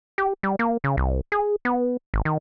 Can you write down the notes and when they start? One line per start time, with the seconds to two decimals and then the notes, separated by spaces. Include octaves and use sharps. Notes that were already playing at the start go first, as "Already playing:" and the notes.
0.18 G4
0.43 G3
0.59 A#3
0.84 C#3
0.97 C2
1.32 G#4
1.65 B3
2.14 G#1
2.25 D#3